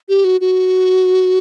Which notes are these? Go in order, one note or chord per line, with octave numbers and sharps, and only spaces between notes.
G4
F#4
F#4